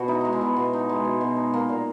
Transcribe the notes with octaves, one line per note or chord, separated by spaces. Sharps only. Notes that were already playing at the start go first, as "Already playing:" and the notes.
Already playing: B2 F#4
D#4 E4
G#3 D#4
E4
B2
B2
D#4
G#3
B2
B2
D#4
A#3
A#2